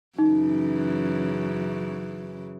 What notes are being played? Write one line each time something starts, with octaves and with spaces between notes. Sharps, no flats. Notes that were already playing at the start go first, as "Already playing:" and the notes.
F#2 C#3 E3 D#4